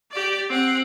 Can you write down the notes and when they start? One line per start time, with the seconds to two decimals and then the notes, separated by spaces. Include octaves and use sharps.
0.12 G4 D5
0.49 C4 F#5